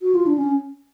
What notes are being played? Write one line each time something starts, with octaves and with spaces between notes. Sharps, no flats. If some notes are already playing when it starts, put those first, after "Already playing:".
F#4
F4
D4
C#4